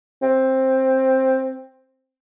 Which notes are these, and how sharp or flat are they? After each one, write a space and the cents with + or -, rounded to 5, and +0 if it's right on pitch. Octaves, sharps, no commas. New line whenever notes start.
C4 +10